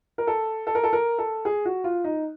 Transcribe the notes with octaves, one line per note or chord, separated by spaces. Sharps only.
A#4
A4
A4
A#4
A4
A#4
A4
G#4
F#4
F4
D#4